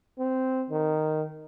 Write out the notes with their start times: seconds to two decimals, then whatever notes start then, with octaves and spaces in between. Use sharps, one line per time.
0.19 C4
0.70 D#3